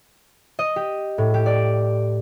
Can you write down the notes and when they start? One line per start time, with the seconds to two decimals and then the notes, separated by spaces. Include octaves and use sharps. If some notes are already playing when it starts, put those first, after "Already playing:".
0.59 D#5
0.76 G4
1.18 A2
1.34 G4
1.46 D5